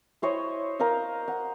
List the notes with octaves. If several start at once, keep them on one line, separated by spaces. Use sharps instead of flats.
E4 C5 C#5 D#5
A#4 C5 D#5 F5
F#5